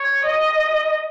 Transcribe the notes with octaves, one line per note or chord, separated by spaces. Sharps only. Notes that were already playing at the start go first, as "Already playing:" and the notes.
Already playing: C#5
D#5